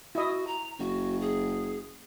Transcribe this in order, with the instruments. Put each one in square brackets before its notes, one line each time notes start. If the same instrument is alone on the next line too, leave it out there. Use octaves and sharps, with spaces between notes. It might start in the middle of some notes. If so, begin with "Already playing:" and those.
[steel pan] E4 D#5 [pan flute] F#4
[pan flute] A#5
[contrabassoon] F#1 [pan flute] F#4
[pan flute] G#4